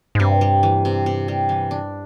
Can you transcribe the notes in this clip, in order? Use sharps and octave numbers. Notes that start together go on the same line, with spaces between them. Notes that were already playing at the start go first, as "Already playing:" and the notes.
G#2
G2 C3
G3
E3
C3
C3
G3
E3
D4